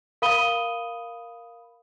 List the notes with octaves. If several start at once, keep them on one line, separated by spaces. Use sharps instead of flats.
A#4 F5 B5 D#6 D#7 G7